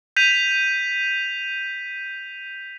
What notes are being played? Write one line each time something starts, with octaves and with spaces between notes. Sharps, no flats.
G6 B6 D#7 F7